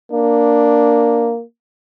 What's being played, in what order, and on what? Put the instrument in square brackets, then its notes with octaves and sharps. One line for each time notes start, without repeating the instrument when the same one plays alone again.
[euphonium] A#3 [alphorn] D4